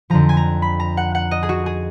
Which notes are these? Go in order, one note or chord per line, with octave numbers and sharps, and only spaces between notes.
F2 D3 F3 A#5
G#5
A#5
B5
A#5
F#5
F#5
D#5
G#4
F#4
G#4